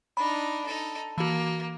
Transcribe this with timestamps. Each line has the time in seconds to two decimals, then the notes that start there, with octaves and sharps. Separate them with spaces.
0.17 D4 D#4 B5
0.66 D#4 A4
1.18 E3 A#3 F#4